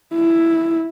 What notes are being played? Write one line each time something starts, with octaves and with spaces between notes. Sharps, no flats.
E4